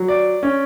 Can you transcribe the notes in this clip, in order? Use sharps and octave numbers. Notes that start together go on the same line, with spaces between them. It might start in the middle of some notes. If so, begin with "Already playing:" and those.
Already playing: F#3
D5
C#4